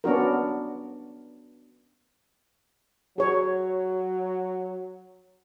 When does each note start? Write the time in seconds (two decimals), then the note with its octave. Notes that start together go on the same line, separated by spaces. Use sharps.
0.04 B3 C#4 D4 F#4 A#4
3.18 F#3 G#4 C#5